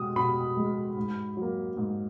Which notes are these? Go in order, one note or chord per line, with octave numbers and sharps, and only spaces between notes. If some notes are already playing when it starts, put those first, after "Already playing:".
Already playing: B2 G#3 D#6
B2 B5
G#3
G#2
F#3 A#3
G#2